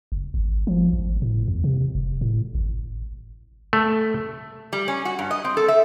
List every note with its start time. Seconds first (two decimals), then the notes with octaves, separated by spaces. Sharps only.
0.12 F#1
0.34 G#1
0.67 F3
0.93 G#1
1.22 A2
1.48 E2
1.64 C3
1.95 F1
2.21 A2
2.55 G#1
3.73 A3
4.73 G3
4.88 C#4
5.05 F#4
5.19 G2
5.31 D#5
5.45 C4
5.57 A4
5.68 E5